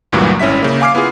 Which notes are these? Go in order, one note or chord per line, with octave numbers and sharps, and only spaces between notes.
D2 G2 A#2 E3 F#3 G3
G#1 C#4 E4 E5 B6
C#3 A#3
F5 G#5 D6 F6 C7
B3 E4 F4 G#4